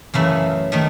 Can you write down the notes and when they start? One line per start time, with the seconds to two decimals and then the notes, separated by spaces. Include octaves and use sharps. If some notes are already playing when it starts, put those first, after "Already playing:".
0.14 F#2 C#3 E3 A3 E4
0.72 D#3 A3 D#4